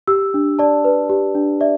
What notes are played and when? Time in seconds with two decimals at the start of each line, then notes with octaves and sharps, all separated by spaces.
0.07 G4 E6
0.34 D4
0.59 D5 A5
0.84 B4
1.09 G4
1.35 D4
1.61 D5 E5